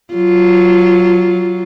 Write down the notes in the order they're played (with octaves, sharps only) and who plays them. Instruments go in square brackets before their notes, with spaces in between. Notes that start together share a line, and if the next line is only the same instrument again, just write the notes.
[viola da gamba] F#3 F4